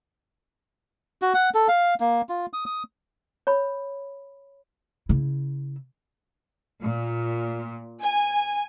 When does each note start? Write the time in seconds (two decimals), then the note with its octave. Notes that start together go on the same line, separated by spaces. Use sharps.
1.22 F#4
1.34 F#5
1.54 A4
1.68 F5
2.00 A#3
2.29 F4
2.53 D#6
2.66 D#6
3.47 C#5 B5
5.09 C#3 E4
6.82 A#2
8.00 G#5